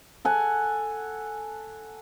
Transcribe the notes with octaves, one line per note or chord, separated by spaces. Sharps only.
A4 F#5 G#5